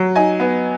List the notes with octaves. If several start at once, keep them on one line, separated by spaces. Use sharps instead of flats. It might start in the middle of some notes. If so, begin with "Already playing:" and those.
Already playing: F#3
D#4 G#5
B3